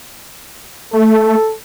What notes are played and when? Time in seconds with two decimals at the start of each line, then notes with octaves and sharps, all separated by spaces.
0.93 A3 A4